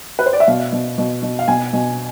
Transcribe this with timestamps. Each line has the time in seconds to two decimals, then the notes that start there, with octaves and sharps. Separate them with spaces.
0.19 B4
0.26 C5
0.33 D5
0.40 E5
0.47 B2 F5
0.73 B2
0.98 B2
1.23 B2
1.39 F5
1.48 B2 G#5
1.73 B2